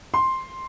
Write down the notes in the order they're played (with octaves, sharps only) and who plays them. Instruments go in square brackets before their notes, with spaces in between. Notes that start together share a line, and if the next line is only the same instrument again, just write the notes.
[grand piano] C6